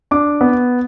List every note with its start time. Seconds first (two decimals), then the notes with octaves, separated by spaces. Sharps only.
0.11 D4 D6
0.41 B3